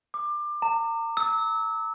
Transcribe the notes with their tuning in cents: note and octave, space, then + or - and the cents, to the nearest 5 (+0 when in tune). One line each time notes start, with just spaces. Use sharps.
D6 +25
A#5 -35
E6 -30